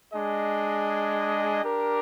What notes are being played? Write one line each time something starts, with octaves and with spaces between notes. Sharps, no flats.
G#3 D4 G#4 D#5
D4 G4 A#4